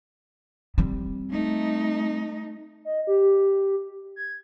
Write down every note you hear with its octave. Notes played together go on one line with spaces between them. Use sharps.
G3 C4
A3 D#4
D#5
G4
G#6